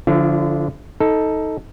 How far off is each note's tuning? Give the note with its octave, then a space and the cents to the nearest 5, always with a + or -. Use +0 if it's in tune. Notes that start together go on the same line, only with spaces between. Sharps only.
D3 -20 F3 +0 E4 +45
D#4 +15 A4 +0